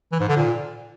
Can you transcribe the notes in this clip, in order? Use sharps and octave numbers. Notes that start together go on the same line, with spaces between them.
E3
G#2
D3
A#2